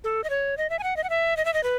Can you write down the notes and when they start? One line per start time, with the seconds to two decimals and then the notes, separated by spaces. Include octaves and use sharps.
0.04 A4
0.24 D#5
0.30 C#5
0.58 D#5
0.70 E5
0.79 G#5
0.83 F#5
0.97 D#5
1.04 F#5
1.10 E5
1.37 D#5
1.45 E5
1.54 D#5
1.64 B4